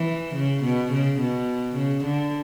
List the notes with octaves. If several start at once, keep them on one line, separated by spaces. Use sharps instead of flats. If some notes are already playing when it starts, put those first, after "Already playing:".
Already playing: E3
C#3
B2
C#3
B2
C#3
D3